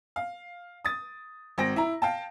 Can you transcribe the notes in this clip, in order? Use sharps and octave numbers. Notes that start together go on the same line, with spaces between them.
F5
D#6 A6
G#1 C4 C5 G5 A#6 D7
E4 A#5
F5 G5 A5